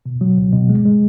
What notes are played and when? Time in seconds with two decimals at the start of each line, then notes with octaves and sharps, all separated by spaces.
0.06 B2
0.21 F#3
0.38 C#2
0.53 B2
0.69 G#3
0.85 G#3